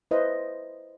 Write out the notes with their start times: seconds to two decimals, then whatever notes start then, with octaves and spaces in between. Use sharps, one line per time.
0.11 E4 B4 C5 D#5